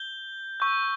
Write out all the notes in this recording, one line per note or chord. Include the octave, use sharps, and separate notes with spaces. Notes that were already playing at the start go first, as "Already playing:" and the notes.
Already playing: G6 G7
C#6 E6 G6